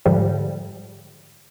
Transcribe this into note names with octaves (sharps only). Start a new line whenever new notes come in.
G#2 D3 F3 G3